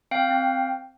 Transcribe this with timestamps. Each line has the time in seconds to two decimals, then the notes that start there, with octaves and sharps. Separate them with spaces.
0.11 C4 F5 G5
0.31 C4